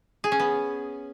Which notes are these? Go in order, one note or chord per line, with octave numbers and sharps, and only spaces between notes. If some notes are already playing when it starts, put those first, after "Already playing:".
G#4
C#4
B3